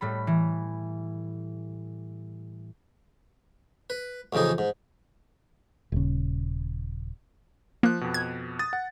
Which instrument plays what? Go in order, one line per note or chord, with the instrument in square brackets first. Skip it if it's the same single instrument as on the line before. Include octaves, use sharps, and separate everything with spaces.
[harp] A2 G3 B5
E3
[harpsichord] B4
A1 F2 C#3 D#4 G#4
G#2
[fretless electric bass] D#1 C#3
[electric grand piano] F3 F#6 [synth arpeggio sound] A#3
[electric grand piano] F2 B2
[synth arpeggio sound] G#6
[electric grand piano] D#6 A6
F#5